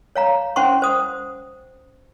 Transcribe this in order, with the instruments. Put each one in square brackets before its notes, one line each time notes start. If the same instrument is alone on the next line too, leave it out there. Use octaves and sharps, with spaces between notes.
[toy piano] C#5 F5 A#5
C#4 C5 F#5 C6 C#6
C5 D#6